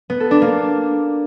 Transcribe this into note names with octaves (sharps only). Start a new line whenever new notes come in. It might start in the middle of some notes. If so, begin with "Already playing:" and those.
B3
A4
D4
A#3